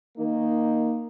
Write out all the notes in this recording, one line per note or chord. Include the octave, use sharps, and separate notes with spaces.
D#3 A#3 D#4